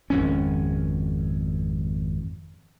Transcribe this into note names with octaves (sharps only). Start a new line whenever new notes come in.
G#1 F2 C#4